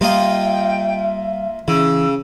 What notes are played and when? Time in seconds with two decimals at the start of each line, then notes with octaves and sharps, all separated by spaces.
0.01 G3 A#3 F4 D#5 E5 G5
1.68 C#3 E3 E6